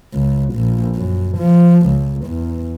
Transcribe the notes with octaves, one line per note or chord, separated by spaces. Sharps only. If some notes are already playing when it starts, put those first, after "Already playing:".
C#2
A#1
F#2
F3
C#2
E2